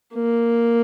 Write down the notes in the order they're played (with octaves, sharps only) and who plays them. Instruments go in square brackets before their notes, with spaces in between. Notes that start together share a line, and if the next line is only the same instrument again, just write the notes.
[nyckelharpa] A#3